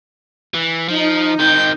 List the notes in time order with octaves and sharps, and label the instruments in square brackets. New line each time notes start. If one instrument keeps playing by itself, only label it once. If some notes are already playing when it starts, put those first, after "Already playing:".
[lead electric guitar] E3
[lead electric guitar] F3 [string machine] D#4
[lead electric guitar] D#3 C4 [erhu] G6